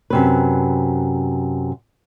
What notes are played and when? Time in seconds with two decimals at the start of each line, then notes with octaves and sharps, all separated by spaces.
0.10 F#2 C3 B4